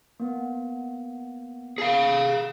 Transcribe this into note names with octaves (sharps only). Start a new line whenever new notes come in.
A#3 B3
G#4 F5